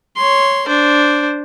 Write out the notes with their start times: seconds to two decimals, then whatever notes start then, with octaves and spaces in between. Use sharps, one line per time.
0.16 C#5 C6
0.66 D4 C5